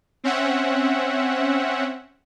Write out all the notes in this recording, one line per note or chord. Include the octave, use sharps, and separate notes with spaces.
C4 C#4 E5 F#5